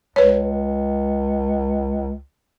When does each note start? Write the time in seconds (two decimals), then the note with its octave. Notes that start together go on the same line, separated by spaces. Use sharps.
0.16 C#2 B4 C#5